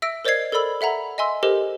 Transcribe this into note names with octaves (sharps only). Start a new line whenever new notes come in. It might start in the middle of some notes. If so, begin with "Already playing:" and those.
E5 E6 A#6 D7
A#4 C5 D5 D#5 G#6 C7
A4 A#4 D5 B5 E6 F#7
A4 E5 F#5 A#5 B5
D#5 E5 G#5 C6 E6
G4 A4 A#4 C5 D#5 E7